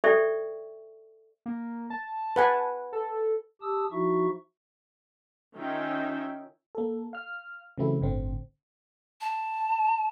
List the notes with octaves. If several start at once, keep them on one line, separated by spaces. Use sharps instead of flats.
A4 C5 D5 E5 G5 C#6
A#3
A5
B4 F#5 G#5
A4
G4 A5 D#6 E6
F3 D#4 E4 F#4 E5 C#6
D#3 C#4 D#4 F4 E5 G5
A#3 A4
F5 F6
C#3 E3 F#3 A3 C4 E4
G1 A2 D3 C4
A5